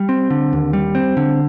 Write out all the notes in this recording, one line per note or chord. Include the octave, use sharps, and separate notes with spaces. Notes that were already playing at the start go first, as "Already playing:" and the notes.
Already playing: G3
C4
D3
D#2
G3
C4
D3